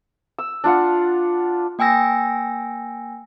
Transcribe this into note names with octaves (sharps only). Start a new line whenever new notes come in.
E6
D4 F4 F5 F#5
A#3 G5 G#5 E6 A#6